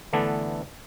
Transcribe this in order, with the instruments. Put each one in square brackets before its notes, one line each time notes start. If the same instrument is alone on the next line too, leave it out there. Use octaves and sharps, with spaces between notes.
[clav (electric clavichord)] D3 E3 A3 B3 D4 A4